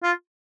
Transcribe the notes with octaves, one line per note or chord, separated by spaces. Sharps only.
F4